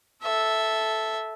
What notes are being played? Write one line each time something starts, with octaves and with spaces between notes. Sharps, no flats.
A4 E5